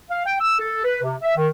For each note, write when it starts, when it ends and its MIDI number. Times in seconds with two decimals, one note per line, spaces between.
0.11 0.22 77
0.26 0.36 79
0.41 0.55 88
0.59 0.82 69
0.84 1.01 71
1.03 1.15 48
1.22 1.32 76
1.36 1.47 51